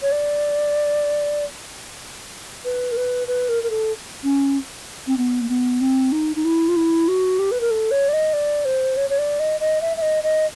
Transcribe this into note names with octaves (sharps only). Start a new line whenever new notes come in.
C#5
D5
B4
A#4
B4
B4
A#4
A#4
A4
C#4
C4
B3
A#3
B3
C4
D#4
D#4
E4
F4
E4
F#4
G4
B4
A#4
A4
C#5
D5
D#5
D5
C5
C#5
C#5
D5
D#5
D#5
E5
E5
D#5
D#5